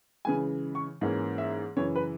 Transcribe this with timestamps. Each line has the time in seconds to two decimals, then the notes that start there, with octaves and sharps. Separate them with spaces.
0.25 C#3 E3 G#3 G#5
0.75 C#6
1.01 G#2 E3 A#3 C#4
1.38 E5
1.76 F#2 C#3 E3 C#5
1.96 B4